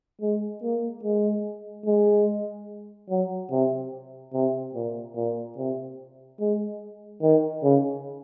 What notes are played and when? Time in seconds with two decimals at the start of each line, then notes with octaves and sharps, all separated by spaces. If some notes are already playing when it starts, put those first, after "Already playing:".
0.21 G#3
0.62 A#3
1.03 G#3
1.86 G#3
3.09 F#3
3.51 C3
4.33 C3
4.74 A#2
5.16 A#2
5.57 C3
6.40 G#3
7.22 D#3
7.63 C#3